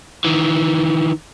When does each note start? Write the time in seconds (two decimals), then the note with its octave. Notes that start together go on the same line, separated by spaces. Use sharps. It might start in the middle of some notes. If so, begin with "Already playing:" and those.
0.25 D#3 E3